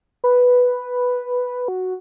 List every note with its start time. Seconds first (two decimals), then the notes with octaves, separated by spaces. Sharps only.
0.24 B4
1.68 F#4